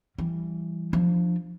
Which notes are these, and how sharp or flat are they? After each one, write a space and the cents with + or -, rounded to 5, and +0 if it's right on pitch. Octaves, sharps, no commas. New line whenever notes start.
E3 +20 G3 -5
F3 +0 D4 +30